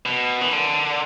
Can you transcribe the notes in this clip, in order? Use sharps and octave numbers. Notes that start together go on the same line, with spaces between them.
B2
E3
D3